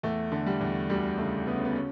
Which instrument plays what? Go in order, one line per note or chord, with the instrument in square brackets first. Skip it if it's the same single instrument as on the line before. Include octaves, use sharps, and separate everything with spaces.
[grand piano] E2 A3
D3
G3
E2
D2 G3
C#3 A3
C#3 B3
C#4
B3
C#4